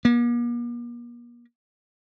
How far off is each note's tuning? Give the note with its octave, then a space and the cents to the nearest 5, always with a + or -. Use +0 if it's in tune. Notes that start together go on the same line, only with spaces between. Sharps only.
A#3 +45